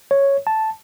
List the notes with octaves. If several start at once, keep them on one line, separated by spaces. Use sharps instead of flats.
C#5
A5